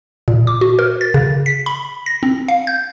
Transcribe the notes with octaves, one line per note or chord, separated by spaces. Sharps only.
A#2
D6
F#4
A#4
A6
C#3
B6
B5
A#6
C4
F5
G6